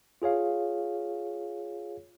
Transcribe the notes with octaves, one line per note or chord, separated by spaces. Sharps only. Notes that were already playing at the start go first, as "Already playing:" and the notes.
F4 G#4 C#5 F5